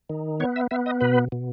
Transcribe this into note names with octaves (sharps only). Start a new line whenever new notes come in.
D#3
B3 C#5
E5
B3 E5
D#5
B2 B4
B2